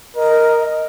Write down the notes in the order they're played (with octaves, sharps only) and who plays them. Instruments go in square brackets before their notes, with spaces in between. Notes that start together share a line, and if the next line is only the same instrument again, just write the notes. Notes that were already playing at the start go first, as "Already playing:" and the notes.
[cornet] A#4 [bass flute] D#5